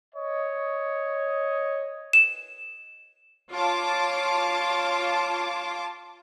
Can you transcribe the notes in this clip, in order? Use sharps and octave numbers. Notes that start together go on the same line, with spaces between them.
C#5 D#5
E7
F4 C#5 A5 D6